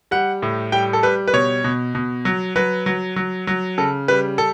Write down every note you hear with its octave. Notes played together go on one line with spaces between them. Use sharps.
G3 F#5
A2
G3 G5
A4
G3 B4
B4
B2 C#5
B2
B2
F#3
F#3 B4
F#3
F#3
F#3
C#3 A4
G3 B4
A4